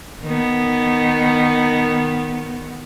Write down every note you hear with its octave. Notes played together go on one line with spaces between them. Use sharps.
D#3 B3